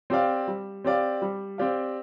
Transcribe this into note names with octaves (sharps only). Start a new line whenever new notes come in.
C4 G4 D5 F5
G3
C4 G4 D5 F5
G3
C4 G4 D5 F5